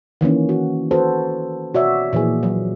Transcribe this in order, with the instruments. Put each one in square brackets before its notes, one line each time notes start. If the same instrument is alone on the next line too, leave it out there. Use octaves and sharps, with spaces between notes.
[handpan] D#3 E3 A#3 C#4
F#4
F#4 A4 B4 C5
B2 F#4 C#5 D5 E5
A#2 E3 F3 G#4
F#3